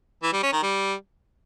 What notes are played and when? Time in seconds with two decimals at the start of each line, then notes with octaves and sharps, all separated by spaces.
0.23 E3
0.33 G3
0.43 C#4
0.53 D#3
0.63 G3